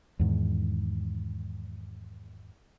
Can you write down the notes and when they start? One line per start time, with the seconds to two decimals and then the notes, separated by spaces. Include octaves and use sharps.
0.19 E2 G#2 D#3